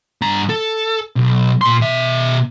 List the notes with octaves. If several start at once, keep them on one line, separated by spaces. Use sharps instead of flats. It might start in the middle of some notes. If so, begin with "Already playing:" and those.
G2 A#5
A4
B1
A#2 C6
B2 E5